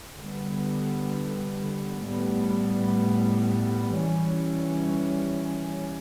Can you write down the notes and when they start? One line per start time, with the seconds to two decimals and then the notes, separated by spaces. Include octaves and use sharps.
0.15 D3 G3 B3
2.05 A2 G3 B3
3.96 E3 G3 C#4